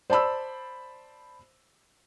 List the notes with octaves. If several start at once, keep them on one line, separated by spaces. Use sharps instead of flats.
C5 D5 A5 B5 E6